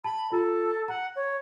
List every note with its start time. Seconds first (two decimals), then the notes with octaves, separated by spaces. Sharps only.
0.04 A5 B5
0.32 F4 A4 A#5
0.88 F#5 A#5
1.16 C#5